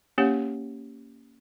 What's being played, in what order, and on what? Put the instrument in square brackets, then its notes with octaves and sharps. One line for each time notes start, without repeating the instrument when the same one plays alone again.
[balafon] A#3 C#4 G4 C#5 F#5